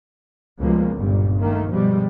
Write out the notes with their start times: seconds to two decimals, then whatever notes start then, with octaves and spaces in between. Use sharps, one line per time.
0.59 C#2 B2 F3 G3 G#3 A#3
0.95 G1 C#2 G2 A#2 G3
1.38 D#3 A3 A#3
1.71 G2 B2 F3 G3 G#3